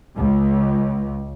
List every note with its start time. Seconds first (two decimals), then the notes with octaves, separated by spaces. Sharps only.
0.16 C#2